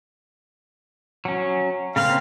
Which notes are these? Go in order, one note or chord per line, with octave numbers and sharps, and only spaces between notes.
F#3 C#4
C#3 A#3 C4 F5